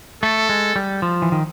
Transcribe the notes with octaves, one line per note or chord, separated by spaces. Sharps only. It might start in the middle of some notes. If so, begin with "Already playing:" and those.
A3 A4
G#3
G3
F3
E3
D#3